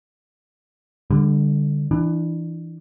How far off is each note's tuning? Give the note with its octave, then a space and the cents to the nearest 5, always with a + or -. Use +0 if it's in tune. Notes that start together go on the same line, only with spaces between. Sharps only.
D3 +0 G3 +35
E3 +0 D4 +30